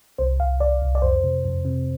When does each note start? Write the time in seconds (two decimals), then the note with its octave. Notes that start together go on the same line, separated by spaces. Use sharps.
0.18 C2 C5
0.40 C2 F5
0.60 C2 D5
0.82 C2
0.95 D5
1.02 F2 C5
1.24 C3
1.45 F2
1.65 C3